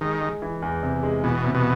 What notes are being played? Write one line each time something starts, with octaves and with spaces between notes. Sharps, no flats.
D#3 G#3
G#3
E3
E2
C3
G#3
B2 E3
C3
B2